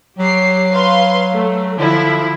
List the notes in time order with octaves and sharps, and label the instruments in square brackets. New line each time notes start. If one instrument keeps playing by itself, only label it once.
[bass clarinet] F#3 [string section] G4 C7
[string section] B4 F5 C6
A3
[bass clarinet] D3 [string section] F3 E4